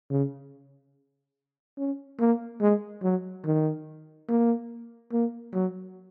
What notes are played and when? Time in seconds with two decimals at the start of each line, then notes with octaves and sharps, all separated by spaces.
0.11 C#3
1.78 C#4
2.20 A#3
2.61 G#3
3.03 F#3
3.45 D#3
4.28 A#3
5.12 A#3
5.54 F#3